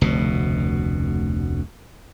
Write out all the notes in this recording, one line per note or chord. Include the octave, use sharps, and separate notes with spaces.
F1 D2 B2